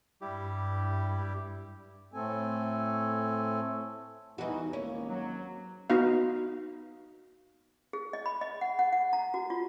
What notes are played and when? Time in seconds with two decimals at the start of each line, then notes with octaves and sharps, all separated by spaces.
0.21 G2 G3 E4 G4
2.14 A2 A3 C4 A4 G#5
4.38 E1 E3 G3 D#4 F#4 B4
4.73 G#1 A#3 C#4 C#5
5.07 F#3
5.90 B3 D#4 F#4 F5
7.93 G#4
8.13 D#5
8.26 B5
8.41 D#5
8.61 F#5
8.79 F#5
8.93 F#5
9.13 A#5
9.34 F#4
9.50 F4